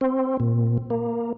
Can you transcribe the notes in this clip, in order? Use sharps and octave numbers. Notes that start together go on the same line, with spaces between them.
C4
A#2
A#3